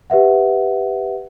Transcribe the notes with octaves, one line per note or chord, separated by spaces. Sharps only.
G4 B4 E5 F#5